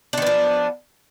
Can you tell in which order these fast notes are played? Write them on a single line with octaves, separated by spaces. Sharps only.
D4 D#3 B3 F3